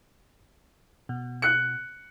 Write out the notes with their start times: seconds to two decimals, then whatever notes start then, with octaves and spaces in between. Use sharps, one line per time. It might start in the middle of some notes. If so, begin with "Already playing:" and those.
1.09 B2
1.42 F#6 C#7